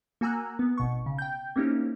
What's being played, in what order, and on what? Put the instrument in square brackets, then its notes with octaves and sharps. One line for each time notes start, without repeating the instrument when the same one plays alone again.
[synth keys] A#3 F#4 G#5 A#5 E6 F#6
B3
G#1 B2 C#6
C#3
G5 G6
A#3 C4 C#4 D#4 E4 G4